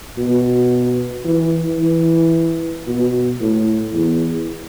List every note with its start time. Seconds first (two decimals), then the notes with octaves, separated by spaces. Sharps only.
0.18 B2
1.25 E3
1.80 E3
2.87 B2
3.40 A2
3.94 E2